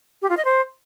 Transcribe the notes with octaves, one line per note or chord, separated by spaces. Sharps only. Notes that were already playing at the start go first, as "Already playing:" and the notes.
G4
F4
D#5
C5